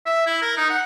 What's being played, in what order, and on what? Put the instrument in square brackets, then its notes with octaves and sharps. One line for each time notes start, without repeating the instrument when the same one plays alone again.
[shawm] E5
E4
A#4
D#4
F#5